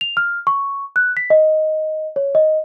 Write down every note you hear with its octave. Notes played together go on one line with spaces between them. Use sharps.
F7
F6
C#6
F#6
B6
D#5
C#5
D#5